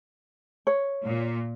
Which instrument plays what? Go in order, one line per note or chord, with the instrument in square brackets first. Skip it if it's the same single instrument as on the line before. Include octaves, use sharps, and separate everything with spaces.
[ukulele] C#5
[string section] A#2